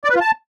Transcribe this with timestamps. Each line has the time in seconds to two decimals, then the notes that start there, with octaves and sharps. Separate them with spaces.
0.04 D5
0.10 B4
0.15 F4
0.21 A5